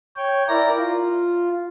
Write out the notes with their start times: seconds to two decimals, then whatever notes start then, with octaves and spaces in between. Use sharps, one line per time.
0.17 C#5 G5
0.48 E4 A#4 D5 A#6
0.79 F4